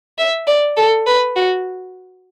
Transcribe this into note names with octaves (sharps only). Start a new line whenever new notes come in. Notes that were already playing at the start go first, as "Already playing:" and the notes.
E5
D5
A4
B4
F#4